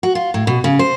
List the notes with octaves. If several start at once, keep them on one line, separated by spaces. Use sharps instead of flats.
F#4
F4
A2
B2
C#3
C5